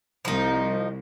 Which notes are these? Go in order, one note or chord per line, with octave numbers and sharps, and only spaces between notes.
C2 F3 D#4